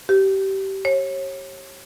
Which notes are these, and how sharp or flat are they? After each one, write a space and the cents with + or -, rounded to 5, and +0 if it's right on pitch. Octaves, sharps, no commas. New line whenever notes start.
G4 -25
C#5 -30